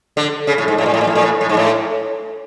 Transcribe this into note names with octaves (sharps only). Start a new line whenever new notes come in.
D3
C#3
A2
G#2
A2
A#2
A2
A#2
A2
A#2
A2
A2
G#2
A2